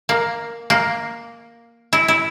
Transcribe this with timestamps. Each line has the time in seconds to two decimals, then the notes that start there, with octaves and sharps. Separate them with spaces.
0.09 A#3
0.70 A#3
1.93 E4
2.08 E4